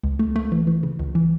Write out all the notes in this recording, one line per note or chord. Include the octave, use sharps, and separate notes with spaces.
C#2
A3
A3
E3
E3
C#3
C#2
E3